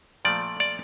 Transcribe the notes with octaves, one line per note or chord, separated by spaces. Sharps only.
A#2 F3 A3 D5
D5